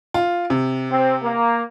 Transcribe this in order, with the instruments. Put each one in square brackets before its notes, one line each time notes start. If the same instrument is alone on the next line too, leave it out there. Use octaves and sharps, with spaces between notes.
[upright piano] F4
C3
[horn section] C4
A#3